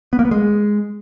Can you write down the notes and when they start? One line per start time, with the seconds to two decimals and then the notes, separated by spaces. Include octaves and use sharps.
0.13 B3
0.19 A#3
0.25 B3
0.31 G#3